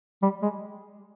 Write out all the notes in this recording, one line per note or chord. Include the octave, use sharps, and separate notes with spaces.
G3
G#3